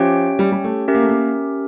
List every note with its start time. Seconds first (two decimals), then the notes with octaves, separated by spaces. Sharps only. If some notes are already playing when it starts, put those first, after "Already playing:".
Already playing: F3 C#4 G4 C#5 E5 G5
0.39 G3
0.52 G3
0.64 A3
0.88 C#4 G4 A#4 E5
0.95 A#3
1.02 A3
1.09 A#3